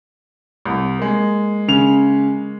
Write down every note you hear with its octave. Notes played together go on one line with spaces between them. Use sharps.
C2
G#3 A#3
C#3 F7